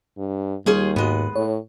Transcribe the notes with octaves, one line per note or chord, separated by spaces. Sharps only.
G2
D#2 G3 F4 G#4 C#5
G#2 G#3 B3 F#4
A2 C#5